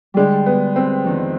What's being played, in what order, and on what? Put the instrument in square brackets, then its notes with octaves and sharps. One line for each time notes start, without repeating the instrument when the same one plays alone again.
[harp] D3 G3 D4 G4 [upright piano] G#3
[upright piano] B3
C4
[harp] F2 D#3 B3 D4